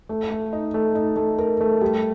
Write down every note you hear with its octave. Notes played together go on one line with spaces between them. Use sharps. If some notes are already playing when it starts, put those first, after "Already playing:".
A3
A3
D#4
A3
D#4
A3
A#4
A3
G3